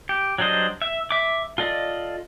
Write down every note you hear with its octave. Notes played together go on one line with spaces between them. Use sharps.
G4
F#3 G3 D4 C5 D#5
E5
E5 D6
F4 A4 D5 D#5